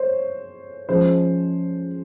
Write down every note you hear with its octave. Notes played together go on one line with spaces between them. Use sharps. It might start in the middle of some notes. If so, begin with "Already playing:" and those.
Already playing: C5 C#5
F3 G#3 C#4 C5